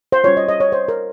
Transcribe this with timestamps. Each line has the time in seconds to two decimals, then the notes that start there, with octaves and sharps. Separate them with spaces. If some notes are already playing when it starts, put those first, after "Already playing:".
0.12 C5
0.24 G3 C#4 F4 C#5
0.37 D#5
0.49 D#5
0.60 C#5
0.72 C5
0.88 A#4